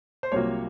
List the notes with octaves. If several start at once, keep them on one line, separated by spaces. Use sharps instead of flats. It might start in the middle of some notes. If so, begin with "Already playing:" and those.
C5
C2 C3 F#3 A#3 F4 C#5